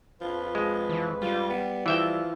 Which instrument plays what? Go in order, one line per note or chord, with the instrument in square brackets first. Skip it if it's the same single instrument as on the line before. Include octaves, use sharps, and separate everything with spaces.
[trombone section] F2 B4 [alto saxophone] F3
[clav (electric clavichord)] G#3
[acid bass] E3
[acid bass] G3 [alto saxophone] F4
[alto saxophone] B3
[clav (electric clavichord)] E3 E5 G5 [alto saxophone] F3